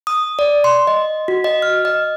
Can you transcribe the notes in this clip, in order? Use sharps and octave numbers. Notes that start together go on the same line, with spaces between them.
D#6
D5
C6
D#5
F#4
D#5
F6
D#5